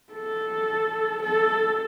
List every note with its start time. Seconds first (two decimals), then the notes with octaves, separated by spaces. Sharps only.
0.13 A4
1.22 A4